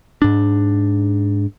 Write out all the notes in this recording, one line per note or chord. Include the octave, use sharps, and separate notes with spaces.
G#2 D4